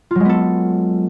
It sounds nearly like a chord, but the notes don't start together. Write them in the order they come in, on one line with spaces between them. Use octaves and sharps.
F4 F#3 G#3 B3 A4